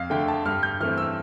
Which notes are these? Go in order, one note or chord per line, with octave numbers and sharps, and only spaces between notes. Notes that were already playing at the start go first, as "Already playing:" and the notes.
Already playing: F2 F5
D3 A3 G5
A5
G2 F6
G6
E3 A3 C4 F6
E6